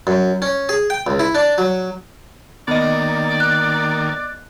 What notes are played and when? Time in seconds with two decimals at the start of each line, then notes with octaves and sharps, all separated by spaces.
0.07 F#2
0.42 C#4
0.69 G#4
0.90 G5
1.07 C#2
1.19 E4
1.35 D4
1.58 F#3
2.68 D#3 A#3 B3 D5 D#5
3.40 F#6